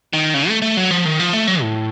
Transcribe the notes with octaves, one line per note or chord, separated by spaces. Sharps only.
D#3
C#3
A3
A3
F#3
F3
D#3
F3
A3
F#3
A2